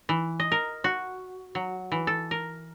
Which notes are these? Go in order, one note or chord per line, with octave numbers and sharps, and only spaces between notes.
E3
D#5
A#4
F#4
F#3
E3
A4
A#4